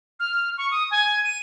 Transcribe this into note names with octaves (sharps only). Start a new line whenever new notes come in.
F6
C#6
D#6
G#5
D#7